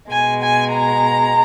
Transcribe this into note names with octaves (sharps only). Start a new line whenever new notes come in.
B2 G#3 G#5
G#5
A#5